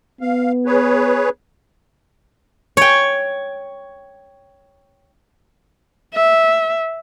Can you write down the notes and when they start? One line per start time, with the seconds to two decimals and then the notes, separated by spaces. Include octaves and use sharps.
0.21 B3 F5
0.66 G#4 B4 C#5
2.77 C#5 G5
6.14 E5